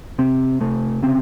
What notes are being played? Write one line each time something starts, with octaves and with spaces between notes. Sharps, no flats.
C3 C4
C3 A3
C#3 C4